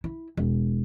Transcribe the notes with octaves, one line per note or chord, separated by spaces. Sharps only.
E4
E1